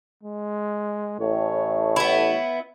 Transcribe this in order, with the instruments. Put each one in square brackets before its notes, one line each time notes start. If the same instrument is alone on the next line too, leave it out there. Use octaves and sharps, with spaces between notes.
[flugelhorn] G#3
[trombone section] A1 A2 [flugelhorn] C#5
[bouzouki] B3 E4